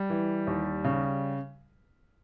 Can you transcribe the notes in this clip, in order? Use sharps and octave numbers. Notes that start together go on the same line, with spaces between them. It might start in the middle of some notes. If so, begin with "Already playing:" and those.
Already playing: G3
E3
D#2
C#3